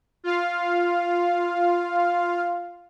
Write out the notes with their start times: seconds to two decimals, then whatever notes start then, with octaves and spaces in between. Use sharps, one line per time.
0.24 F4 F5